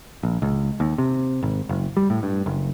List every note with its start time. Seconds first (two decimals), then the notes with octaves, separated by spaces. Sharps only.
0.23 A#1
0.42 C#2
0.80 D#2
0.98 C3
1.43 G#1
1.69 F#1
1.97 G3
2.10 A2
2.23 G2
2.46 F#1